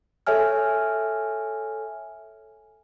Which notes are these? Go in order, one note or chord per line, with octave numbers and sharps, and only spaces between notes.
A4 C#5 E5 G#5 F6